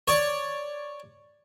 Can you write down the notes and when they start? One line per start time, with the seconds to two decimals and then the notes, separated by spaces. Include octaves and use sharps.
0.08 C#5 D5